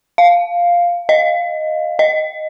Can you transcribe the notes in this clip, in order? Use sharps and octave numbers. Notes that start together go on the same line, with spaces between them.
F5
D#5
D#5